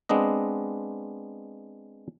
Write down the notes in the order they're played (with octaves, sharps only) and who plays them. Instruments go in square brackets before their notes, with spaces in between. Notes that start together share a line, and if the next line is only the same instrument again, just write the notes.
[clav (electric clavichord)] G#3 B3 C4 D4 D#5